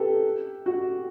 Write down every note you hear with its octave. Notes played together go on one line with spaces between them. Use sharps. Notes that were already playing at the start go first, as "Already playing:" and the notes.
Already playing: G4 A4 B4
F#4